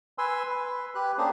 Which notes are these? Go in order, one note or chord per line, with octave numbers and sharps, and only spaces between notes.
B4 G#5 C6 E6
B4
G4 B4 F#6
A#3 C#4 D4 G4 G#4 C5